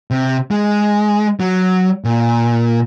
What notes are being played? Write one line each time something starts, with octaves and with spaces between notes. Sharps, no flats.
C3
G#3
F#3
A#2